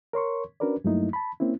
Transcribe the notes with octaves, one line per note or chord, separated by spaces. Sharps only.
A#4 C#5 C6 C#6
C#4 D4 F#4 A#4 B4 D5
G2 F#3 A3 A#3 D#4 E4
A5 B5
A#3 C4 C#4 E4